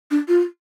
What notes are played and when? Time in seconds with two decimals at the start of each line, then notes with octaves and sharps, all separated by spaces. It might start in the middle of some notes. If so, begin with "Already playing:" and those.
0.11 D4
0.28 F4